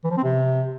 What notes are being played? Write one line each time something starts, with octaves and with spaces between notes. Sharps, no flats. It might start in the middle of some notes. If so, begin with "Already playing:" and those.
E3
F3
C4
C3